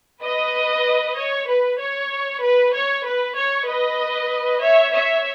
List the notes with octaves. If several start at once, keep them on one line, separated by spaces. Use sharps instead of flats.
B4 D#5
C#5
B4
C#5
B4
C#5
B4
C#5
B4 D#5
C#5 E5
C#5 E5